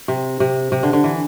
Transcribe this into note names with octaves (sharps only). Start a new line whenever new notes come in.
C3
C3
C3
D3
D3
E3